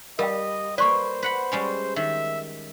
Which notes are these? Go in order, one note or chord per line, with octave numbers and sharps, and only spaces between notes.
G3 A#4 D#5 F5 G5
A#3 B4 C5 D5 C#6
B4 F#5 B5
G3 G#3 C#4
D#3 E5